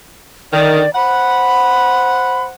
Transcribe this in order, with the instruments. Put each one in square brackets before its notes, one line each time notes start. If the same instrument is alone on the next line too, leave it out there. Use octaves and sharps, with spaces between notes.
[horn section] D3 D#3 [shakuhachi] D5
[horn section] C5 F#5 [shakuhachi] B5